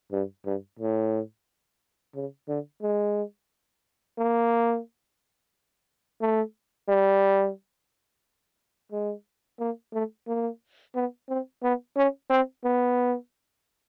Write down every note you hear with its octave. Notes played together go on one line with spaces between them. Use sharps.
G2
G2
A2
C#3
D3
G#3
A#3
A3
G3
G#3
A#3
A3
A#3
B3
C4
B3
C#4
C4
B3